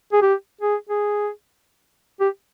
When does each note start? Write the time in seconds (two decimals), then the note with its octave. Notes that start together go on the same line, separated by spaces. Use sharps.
0.12 G#4
0.22 G4
0.61 G#4
0.89 G#4
2.20 G4